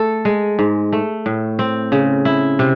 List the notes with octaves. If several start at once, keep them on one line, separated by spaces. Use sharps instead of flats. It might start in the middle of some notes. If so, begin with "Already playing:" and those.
Already playing: A3 A4
G#3
G#2
A3
A2
C4
C#3
E4
C3